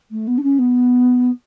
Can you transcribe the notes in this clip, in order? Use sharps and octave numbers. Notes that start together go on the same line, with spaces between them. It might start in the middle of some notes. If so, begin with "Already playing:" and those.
A3
B3
D4
C#4
B3